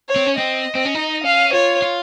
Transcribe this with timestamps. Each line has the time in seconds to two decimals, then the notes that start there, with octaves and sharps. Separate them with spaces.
0.08 C#5
0.16 C4
0.26 C#4
0.37 C4 D#5
0.75 C4
0.85 C#4
0.95 D#4
1.24 C#4 F5
1.53 F4 C#5
1.82 F4